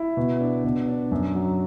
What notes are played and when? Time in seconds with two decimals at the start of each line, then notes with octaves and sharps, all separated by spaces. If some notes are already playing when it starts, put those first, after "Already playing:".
Already playing: E4
0.17 B2
0.41 D4
0.64 B2
0.88 D4
1.11 F#2
1.35 F#3